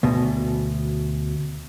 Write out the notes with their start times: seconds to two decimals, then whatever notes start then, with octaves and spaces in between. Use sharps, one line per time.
0.03 D2 B2